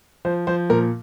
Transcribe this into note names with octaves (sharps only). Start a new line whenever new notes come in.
F3 C5
F3 C5
A#2 A#4